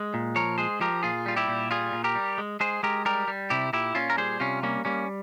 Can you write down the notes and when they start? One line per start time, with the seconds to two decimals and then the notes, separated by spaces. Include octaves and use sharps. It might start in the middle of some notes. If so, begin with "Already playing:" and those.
Already playing: G#3
0.14 A#2
0.36 F3 A#4 C#5
0.58 G#3 G#4 C5
0.80 F3 G4 A#4
1.03 A#2 F4 G#4
1.26 G3 F4
1.36 E4 G4
1.48 A#2
1.71 G3 F4 G#4
1.93 A#2
2.04 G4 A#4
2.15 G3
2.38 G#3
2.60 G#3 G#4 C5
2.83 G#3 G4 A#4
3.05 G3 G4 A#4
3.28 G3
3.50 C3 E4 G4
3.73 A#2 E4 G4
3.95 A#2 C#4 F4
4.10 A#4
4.18 G3 G#4 C5
4.40 C3 C#4 F4
4.63 G3 A#3 C#4
4.85 G3 A#3 C#4